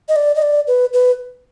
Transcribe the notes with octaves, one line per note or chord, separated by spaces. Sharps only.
D#5
D5
D#5
D5
B4
B4